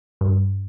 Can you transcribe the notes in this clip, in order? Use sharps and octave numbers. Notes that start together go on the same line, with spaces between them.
G2